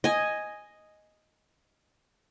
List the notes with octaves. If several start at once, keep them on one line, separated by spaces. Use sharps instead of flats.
D#5 G#5